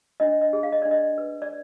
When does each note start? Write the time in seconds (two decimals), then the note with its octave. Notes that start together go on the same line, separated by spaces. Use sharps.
0.20 D4 D#5
0.41 D#5
0.53 G#4
0.63 F5
0.72 D#5
0.82 D4 D5
0.91 D#5
1.18 B4
1.42 D5